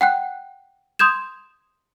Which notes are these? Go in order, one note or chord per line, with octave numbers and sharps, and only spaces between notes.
F#5 G5 F#6
C6 D#6 G6 G#6 E7